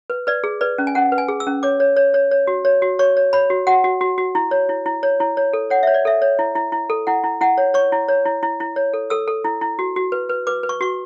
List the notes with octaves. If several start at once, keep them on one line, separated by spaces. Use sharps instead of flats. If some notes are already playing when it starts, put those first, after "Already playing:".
B4
B4 D5
G#4
B4 D5
C#4
G#5
C#4 F#5
B4
G#5
G#4
E6
C#4
C#5 D6
C#5
C#5
C#5
C#5
F#4
C#5
F#4
C#5 C#6
C#5
C#5 B5
F#4
F#4 F#5
F#4
F#4
F#4
E4
C#5
E4
E4
C#5
E4
C#5
A4
C#5 F#5
C#5 E5
D5
A4 E5
C#5
E4
E4
E4
A4
E4 F#5
E4
E4 F#5
C#5
C#5 C#6
E4
C#5
E4
E4
E4
C#5
A4
A4 E6
A4
E4
E4
F#4
F#4
B4
B4
B4 D6
B4
C#6
F#4 C#6